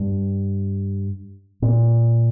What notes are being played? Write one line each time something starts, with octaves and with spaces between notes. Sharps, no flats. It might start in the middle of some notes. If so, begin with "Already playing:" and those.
Already playing: G2
A#2